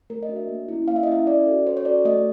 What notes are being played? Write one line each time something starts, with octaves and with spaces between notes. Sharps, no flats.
A3 A#4
D#5
D4 F#4
E5
A#3
C#4 E4
A#3 F5
E5
D#5
C#4 E4 E5
C#4 D5
F#4 A4
C#4 C5
C#5
F#4 A4 D5
A3 D#5